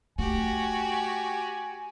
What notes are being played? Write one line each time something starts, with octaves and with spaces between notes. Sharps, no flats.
A3 F#4 G4 G#5